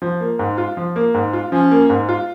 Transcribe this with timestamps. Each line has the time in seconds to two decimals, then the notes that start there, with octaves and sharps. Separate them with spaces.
0.02 F3
0.20 A#3
0.39 G#2
0.58 F4
0.77 F3
0.96 A#3
1.14 G#2
1.33 F4
1.52 F3 C#4
1.71 A#3
1.90 G#2
2.09 F4